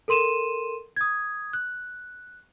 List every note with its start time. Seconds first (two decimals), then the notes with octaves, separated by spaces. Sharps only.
0.08 A4 A#4 C6 D#7 E7
0.96 D#6 G#6
1.53 F#6